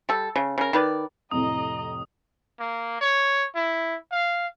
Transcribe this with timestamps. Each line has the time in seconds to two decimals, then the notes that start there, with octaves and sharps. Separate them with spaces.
0.09 G3 A4
0.36 C#3
0.58 C#3 A#4
0.73 D#3 B4 D5
1.31 F2 A2 C3 D#5 A#5 D#6
2.60 A#3
3.01 C#5
3.55 E4
4.11 F5